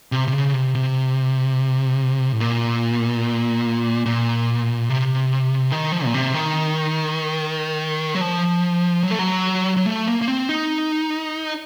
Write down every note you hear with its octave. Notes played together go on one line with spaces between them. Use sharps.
C3
C3
C#3
C3
C3
A2
A#2
A#2
C3
D#3
F3
A#2
C3
D#3
F#3
F3
F#3
A3
F#3
F#3
A3
A#3
A#3
C4
D#4